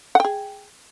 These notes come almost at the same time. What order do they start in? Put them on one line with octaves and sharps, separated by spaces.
F#5 G5 G#4